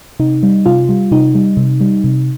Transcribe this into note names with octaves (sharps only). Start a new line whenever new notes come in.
C3 D#4
G3
C3 F4
G3
C3 D#4
G3
C3
G3
C3